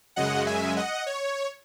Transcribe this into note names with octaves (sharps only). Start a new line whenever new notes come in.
F#2 C#3 G#3 D#5 F#5
E5 G#5
D#5 F#5
C#5